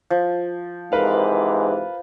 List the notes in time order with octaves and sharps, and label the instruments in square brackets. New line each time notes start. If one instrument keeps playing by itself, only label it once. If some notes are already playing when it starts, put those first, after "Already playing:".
[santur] F3
[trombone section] G#2 C3 E3 [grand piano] A#4 B4 F5